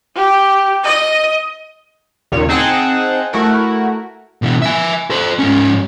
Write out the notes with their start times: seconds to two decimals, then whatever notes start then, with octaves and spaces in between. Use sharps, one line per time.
0.16 G4
0.84 D#5
2.32 D#2 A#2 C#3 C#5
2.49 C4 D#4 G#4 F#5 G5 A5
3.33 A3 E4 F#4 A#4
4.42 B2 E3
4.62 E5 G#5
5.10 A4 C5
5.39 G#2 C#4